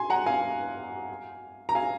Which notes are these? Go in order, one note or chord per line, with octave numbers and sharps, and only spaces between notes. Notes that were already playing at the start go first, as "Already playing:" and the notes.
Already playing: G#5 C6
F#5 A#5
F5 G#5
A#5
F5 G#5